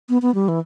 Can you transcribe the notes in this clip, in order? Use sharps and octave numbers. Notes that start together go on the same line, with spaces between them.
B3
B3
G3
E3